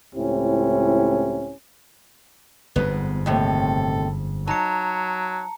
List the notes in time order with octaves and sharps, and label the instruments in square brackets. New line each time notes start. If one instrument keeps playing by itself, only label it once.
[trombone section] C#2 A2 C4 C#4 E4 G4
[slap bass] G1 F2 G#2 [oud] B3
[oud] D#2 A2 C3 [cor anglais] A4
[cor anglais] F#3 [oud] D#4 [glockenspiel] A5 A#5 C#7